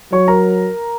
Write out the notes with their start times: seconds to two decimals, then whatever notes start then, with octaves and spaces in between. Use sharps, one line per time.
0.12 F#3 C#5 C#6
0.28 A#4 A#5